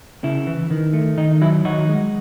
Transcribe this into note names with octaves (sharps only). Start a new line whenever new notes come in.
C#3 E4
E3
D#3
A3
D#3 D#4
F#3 E4
D#3 D#4 F#4
G#3